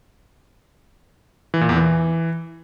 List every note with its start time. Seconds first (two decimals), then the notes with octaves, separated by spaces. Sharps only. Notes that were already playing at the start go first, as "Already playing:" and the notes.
1.54 E3
1.61 A#2
1.69 E2
1.77 E3